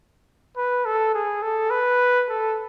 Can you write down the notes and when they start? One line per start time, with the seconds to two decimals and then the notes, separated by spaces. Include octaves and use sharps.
0.57 B4
0.86 A4
1.15 G#4
1.42 A4
1.71 B4
2.29 A4